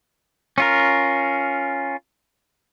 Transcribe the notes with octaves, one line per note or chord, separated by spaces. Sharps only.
C#4 F4 A#4